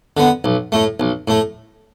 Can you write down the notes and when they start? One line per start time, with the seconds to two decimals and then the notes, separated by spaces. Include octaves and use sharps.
0.17 D3 B3
0.44 B1
0.72 A2 A3
1.00 B1
1.28 A2 A3